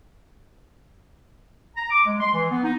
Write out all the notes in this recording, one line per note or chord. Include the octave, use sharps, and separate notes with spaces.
A#5
D6
G#3
C6
E3
B3
D#4